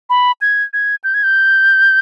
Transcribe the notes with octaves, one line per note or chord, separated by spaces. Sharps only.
B5
G#6
G#6
G6
G#6
G6